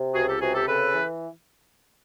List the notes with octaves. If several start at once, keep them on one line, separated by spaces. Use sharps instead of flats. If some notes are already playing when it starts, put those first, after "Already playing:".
Already playing: C3
C#2 F#4 G#4
G4 A4
C3 F#4 G#4
G4 A4
C#3 A4 B4
E3